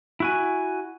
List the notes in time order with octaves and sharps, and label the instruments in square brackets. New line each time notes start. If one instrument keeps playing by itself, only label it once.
[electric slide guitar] E4 F#4 G#5